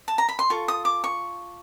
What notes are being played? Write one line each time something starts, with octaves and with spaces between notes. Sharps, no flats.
A5
A#5
B5
C6
F4 A4 C#6
D#6
D6
C#6